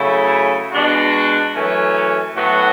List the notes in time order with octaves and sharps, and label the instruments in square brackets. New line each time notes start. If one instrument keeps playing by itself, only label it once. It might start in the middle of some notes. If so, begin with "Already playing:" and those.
Already playing: [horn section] C#3 F#3 A3 E4
B2 G#3 D4 F#4
F#2 E3 A3 C#4
A2 F#3 B3 F#4